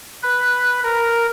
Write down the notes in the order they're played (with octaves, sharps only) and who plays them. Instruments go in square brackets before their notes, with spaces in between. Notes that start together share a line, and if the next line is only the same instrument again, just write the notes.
[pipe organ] B4
A#4